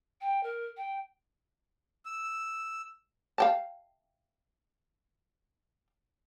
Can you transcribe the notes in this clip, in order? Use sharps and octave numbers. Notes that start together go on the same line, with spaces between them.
G5
A#4
G5
E6
F5 G5 A5